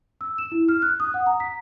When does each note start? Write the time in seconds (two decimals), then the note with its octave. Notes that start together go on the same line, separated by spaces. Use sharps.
0.21 E6
0.38 E7
0.52 E4
0.69 F6
0.82 F#6
1.00 D#6
1.14 F#5
1.26 A#5
1.40 B6